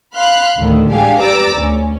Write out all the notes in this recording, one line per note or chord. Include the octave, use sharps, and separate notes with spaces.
F5 B5 C6 F6 F#6
D2 A2 D3 D#3
A1 G#3 D4 G4 G#4 F5
G4 B4 D5 A#5 D6 E6
D2 C#4